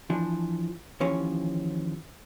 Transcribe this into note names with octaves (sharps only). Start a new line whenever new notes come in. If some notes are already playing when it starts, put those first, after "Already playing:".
E3 F3 D4
D#2 E3 F3 C#4 C#5